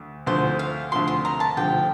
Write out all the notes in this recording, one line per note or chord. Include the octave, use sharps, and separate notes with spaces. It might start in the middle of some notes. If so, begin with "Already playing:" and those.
Already playing: D2
D2 D3 F3 C5
F5
D2 D3 F3 C6
C6
A#5
A5
D2 D3 F3 G5